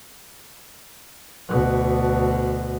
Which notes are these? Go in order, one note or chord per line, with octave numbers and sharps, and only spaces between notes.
D2 B2